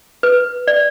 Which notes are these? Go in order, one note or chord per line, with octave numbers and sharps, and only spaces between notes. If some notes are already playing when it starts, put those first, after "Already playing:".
B4
D5